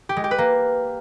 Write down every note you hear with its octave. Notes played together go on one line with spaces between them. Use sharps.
G4
G#3
G4
B4
A#3